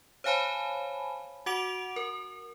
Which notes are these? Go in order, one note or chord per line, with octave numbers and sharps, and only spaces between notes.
C5 C#5 F5 G#5 A5 B5
F#4 F#5 D6 D7 F7
A#4